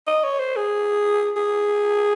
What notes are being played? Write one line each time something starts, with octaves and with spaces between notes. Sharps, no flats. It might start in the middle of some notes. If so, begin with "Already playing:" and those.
D#5
C#5
C5
G#4
G#4